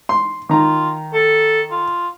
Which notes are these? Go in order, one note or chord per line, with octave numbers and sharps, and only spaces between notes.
C6
D#3 F4 A#5
A4
F4